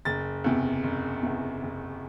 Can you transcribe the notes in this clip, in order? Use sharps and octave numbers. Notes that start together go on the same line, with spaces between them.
F#1 A6
E2 C3
F#1
E2 C3
F#1